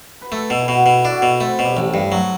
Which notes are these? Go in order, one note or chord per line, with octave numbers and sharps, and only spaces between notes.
B4
A3 A4
B2 A4
E4
B2 F#4
B2 E4
D4 E4
F#4
B2 E4
A3 C4
B2
G3
A1 A3
G2
F#3 A3